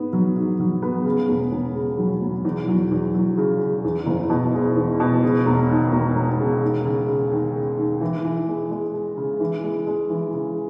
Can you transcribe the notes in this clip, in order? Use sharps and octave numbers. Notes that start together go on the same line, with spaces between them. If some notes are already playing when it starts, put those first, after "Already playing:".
Already playing: G#2 B3
F#3
G#2
F#3
B3
C#3
E1
E1
C#3
F#3
E1
E2
F#3
E2
F#3
C#3
C#3
E2
F#1
B2
G#3
E2
B2
C#3
E1
D#2
E1
E1
C#3
D#2
C#3
C#3
D#2
C#3
D#2
E3
E3
G#3
G#3
G#3
C#3
E3
G#3
G#3
E3
C#3